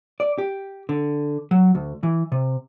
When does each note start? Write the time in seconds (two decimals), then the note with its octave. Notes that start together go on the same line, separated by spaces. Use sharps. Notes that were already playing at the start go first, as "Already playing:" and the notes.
0.20 D5
0.38 G4
0.89 D3
1.51 F#3
1.75 D2
2.03 E3
2.32 C3